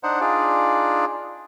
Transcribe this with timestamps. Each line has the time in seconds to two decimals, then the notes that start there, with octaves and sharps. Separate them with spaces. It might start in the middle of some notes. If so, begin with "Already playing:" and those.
0.03 D4 D#4 C5 F#5
0.21 D4 D#4 F4 G#4 D5